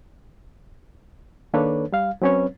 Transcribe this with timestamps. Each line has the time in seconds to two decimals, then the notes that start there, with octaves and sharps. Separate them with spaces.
1.54 D#3 A#3 D4 A4 B4 C#5
1.92 G3 F5
2.22 F#3 C4 C#4 B4 C#5